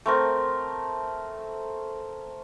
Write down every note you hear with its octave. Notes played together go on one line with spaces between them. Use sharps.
A3 C4 A#4